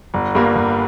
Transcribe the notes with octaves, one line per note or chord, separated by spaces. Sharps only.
G1
G2 G3 A#3
G1